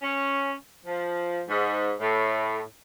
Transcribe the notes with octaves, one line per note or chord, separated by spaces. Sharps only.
C#4
F3
G#2
A2